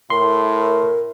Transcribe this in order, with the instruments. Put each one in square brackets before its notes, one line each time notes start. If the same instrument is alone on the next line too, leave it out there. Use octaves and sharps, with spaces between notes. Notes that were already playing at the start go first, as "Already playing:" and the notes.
[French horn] A2 [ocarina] A#4 [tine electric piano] C6